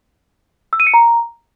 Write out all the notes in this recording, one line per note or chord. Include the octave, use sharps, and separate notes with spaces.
E6
D#7
C#7
A#5